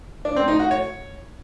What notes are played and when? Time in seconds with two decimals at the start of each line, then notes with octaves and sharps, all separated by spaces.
0.25 D4
0.36 C4
0.48 D#4
0.59 F#4
0.71 C#5